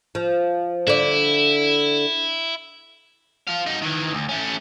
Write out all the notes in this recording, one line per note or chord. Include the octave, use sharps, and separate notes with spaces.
F3
D3 E4 D5
F3 F5
D#4 F#4
D#3 E3
D2
A3 C#4